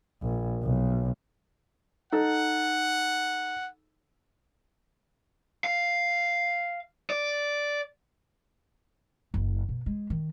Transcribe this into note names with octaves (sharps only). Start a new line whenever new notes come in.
A#1
B1
D#4 A4 F#5
F5
D5
F#1
B2
G#3
D#3